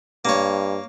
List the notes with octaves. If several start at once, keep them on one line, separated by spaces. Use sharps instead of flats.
G2 A#3 C#5